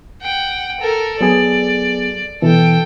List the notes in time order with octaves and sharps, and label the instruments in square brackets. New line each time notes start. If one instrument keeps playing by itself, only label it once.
[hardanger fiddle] F#5 G5
A4 A#4
[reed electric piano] F#3 B3 G#4 [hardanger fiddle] D5
[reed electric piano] B2 E3 [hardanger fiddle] A4 G5